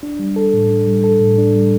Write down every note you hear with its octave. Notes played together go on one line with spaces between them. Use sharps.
D4
G3
A4
A2
D4
G3
A4
A2
D4
G3